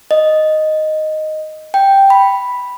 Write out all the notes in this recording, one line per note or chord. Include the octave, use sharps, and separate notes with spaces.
D#5
G5
B5